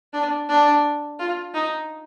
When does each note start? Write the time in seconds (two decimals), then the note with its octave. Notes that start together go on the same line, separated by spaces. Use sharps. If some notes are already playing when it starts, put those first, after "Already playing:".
0.13 D4
0.49 D4
1.19 F4
1.54 D#4